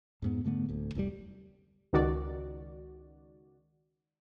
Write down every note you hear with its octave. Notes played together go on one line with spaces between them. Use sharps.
F2 G#2 B3
G#2 D3 A3 B3
D1 D2
F1 C2 D3 G3
C#2 D#3 F#4 D5